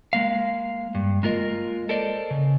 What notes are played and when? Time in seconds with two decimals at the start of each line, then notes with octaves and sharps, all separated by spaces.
0.13 G#3 A#3 F5
0.95 G2
1.23 G#3 A#3 F4 A#4 D#5
1.89 A4 A#4 C5 D5 D#5
2.31 C#3